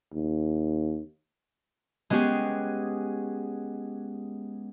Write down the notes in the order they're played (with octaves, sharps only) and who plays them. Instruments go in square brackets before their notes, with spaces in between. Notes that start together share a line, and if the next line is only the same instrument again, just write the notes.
[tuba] D#2
[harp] G#3 B3 C#4 G4 G#4